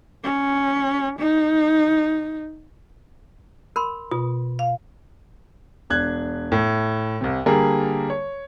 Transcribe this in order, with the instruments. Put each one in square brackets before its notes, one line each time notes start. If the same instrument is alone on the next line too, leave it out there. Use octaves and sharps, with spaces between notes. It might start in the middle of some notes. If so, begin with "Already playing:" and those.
[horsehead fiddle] C#4
D#4
[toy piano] A#4 B5 C6
[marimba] B2 [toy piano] F4
[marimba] F5
[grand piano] E1 D4 F#6 G#6
A2
C2 C3
D3 G3 A#3 G#4 A#4
C#5